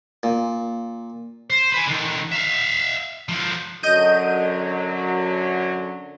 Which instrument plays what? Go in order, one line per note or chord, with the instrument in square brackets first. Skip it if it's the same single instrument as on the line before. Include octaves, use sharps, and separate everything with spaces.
[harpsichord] A#2
[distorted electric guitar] C5
B4 G#5
D3 D#3
E5 F5
D3 F3
[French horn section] F#2 D3 F#3 [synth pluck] D#5 G6 D#7